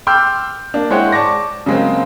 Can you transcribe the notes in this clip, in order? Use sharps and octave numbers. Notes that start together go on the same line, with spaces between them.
G5 C6 D6 E6 F6 G6
A#3 D4
G#3 E4 C5 C#5 F#5 G5
D5 A5 C#6 D6 A#6
C#3 F#3 G#3 A#3 C4